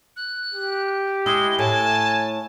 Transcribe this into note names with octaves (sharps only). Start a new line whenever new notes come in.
F#6
G4
G#3 E4 G7
A2 G#5 A5